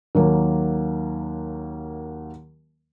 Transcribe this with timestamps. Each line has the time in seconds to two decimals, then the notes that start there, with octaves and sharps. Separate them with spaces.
0.15 D#2 F#3 A#3